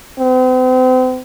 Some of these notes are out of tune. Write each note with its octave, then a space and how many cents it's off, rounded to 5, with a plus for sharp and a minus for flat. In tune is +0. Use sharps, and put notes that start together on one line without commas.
C4 -40